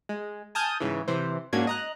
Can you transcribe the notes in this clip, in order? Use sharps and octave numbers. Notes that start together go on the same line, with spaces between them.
G#3
G#5 A5 D#6 F6 G6
G#2 C#3 E3
C3 E3 C5
G#2 A#3 C#4 D4 F#4 G#6
D#5 A#5 F#6